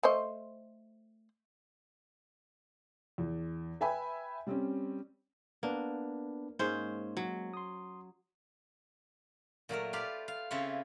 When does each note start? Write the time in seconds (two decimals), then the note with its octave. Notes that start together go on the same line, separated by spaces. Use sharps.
0.03 A3 C5 D#5
3.18 E2
3.81 B4 E5 G5 G#5 B5
4.47 G3 C4 C#4
5.63 A#3 B3 D4 B4
6.59 G#2 G#3 A#3 C#4 C5
7.17 F#3
7.54 C6 D#6
9.69 A#2 F#3 A3 A#4
9.93 F4 G4 B4 D5 F5
10.28 F5
10.51 C#3 C4 E4 F4 B4 C#5